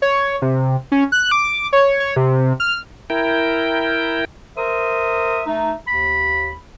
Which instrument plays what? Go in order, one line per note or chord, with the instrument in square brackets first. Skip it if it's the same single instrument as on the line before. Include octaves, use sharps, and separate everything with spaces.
[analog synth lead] C#5
C3
C#4
F#6
D6
C#5
C#5
C3
F6
[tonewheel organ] E4 A#4 G5
[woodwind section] A#4 C5 E5 D#6
A3 D#4
D#2 B5